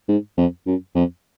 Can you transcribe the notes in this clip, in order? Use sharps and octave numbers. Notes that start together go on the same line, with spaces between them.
G#2
F2
F#2
F2